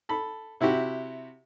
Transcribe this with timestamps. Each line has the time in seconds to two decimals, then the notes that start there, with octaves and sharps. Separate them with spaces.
0.09 A4 B5
0.61 C3 E4 F#4 G4